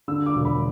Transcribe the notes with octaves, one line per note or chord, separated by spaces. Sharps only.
D3 E6
D6
E1
B5